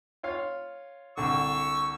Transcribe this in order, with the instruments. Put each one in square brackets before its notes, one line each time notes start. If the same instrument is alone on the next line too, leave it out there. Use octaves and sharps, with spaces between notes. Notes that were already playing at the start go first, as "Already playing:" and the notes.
[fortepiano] F4 C#5 F5
[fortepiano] C2 D3 [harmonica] C#6 E6